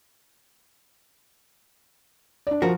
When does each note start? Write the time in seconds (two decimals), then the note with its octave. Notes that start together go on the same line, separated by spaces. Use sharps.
2.47 D4 D5
2.62 F3 F#4 A#4